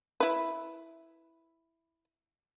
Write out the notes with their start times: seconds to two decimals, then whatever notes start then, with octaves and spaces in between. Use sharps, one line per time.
0.20 E4 B4